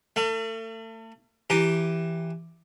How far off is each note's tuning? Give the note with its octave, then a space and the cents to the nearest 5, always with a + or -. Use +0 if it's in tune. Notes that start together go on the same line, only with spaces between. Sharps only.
A3 +35 F5 -45
E3 +5 G4 +0 A#5 -10